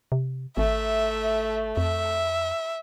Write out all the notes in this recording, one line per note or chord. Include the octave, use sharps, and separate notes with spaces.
C3
G#1 A3 E5
F2 E5